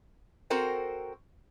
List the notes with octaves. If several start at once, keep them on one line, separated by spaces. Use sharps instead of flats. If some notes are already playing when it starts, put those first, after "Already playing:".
C4 F#4 A4 A#4 C5 G5